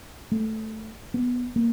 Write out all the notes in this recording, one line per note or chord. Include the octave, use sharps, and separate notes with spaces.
A3
B3
A#3